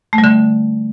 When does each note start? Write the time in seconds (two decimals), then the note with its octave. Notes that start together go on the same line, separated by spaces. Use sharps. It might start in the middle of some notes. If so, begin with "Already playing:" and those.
0.13 A3
0.18 G3
0.24 D3